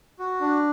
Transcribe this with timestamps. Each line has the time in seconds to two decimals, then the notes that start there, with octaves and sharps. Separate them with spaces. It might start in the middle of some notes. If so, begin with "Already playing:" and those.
0.19 F#4
0.41 D4